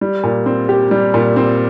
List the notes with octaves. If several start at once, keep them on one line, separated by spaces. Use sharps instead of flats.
G3
A#2
C4
G4
G3
A#2
C4